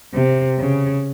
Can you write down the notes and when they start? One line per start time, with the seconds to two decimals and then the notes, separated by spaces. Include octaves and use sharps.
0.14 C3
0.59 C#3